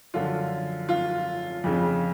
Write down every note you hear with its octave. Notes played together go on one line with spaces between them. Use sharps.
F#2 D3 F3 F4
F4
F2 C#3 F3